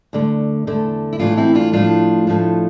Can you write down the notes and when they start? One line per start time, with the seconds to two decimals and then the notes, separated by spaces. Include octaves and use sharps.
0.13 D2 D3 A3
0.67 E2 D3 A3
1.13 E4
1.19 A2 E3 A3 D4 F4
1.37 C4 E4
1.55 D4 F4
1.73 A2 F3 A3 D4 F4
2.27 A2 F3 A3